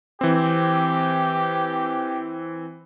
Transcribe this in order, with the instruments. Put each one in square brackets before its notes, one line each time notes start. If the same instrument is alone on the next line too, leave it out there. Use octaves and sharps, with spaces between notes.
[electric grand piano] E3 C4 [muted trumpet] G4